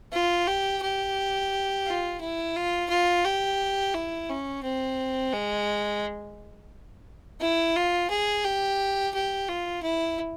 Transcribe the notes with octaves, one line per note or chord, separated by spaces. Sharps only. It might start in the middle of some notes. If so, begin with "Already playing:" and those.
F4
G4
G4
F4
E4
F4
F4
G4
E4
C#4
C4
G#3
E4
F4
G#4
G4
G4
F4
E4